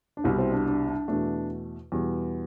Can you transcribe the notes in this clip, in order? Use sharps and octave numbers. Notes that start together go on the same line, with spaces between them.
D4
C2 B2 G3 E4
C4
D4
D4
D4
E2 B2 A3 D4
E2 B2 G3